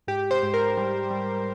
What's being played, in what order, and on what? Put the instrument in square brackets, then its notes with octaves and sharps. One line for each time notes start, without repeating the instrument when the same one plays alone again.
[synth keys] G#2 G4
C5
G#2
A#4
G3
G3